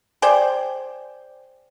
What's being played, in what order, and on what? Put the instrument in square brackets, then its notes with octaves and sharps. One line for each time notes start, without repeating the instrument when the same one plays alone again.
[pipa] G#4 C5 D5 G5